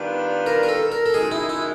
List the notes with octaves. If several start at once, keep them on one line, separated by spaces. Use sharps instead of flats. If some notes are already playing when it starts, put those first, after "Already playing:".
Already playing: D#3 G3 B3 D4 F4
A#4
A#4
A4
A#4
A4
F#2 D#3 G#3 G#4
E4
E4